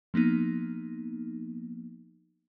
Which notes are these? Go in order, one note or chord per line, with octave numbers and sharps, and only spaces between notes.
F3 A#3 B3 D#4